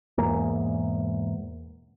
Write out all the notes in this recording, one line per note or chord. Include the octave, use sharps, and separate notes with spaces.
E1 E2 G#2 A#3